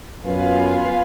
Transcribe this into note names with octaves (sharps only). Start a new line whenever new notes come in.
F#2 B3 F4 B4 F5 G#5